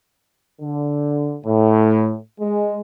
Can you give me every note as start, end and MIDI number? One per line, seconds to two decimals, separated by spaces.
0.60 1.36 50
1.45 2.15 45
2.40 2.80 56